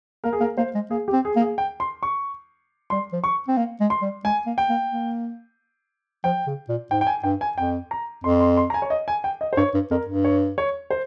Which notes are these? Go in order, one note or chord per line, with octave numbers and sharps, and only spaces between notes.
A#3 A#4
G#4
A#3 A#4
A#3 C5
G#3
A#3 G#4
G4
C4
G#4
A#3
G#4
G5
C6
C#6
G3 C6
F3
C#6
C4
A#3
G#3
C6
G3
G#3 G#5
A#3
G5
A#3
A#3
F3 G5
C#3
A#2
G#2 G5
G5
G#5
G2 G5
G#5
F2 G5
A#5
F2 C6
C6
C6
A#5
G#5
C#5
D#5
G#5
G5
D#5
C5
G2 C#5
G2
F2 A#4
G2
C#5
C#5
C5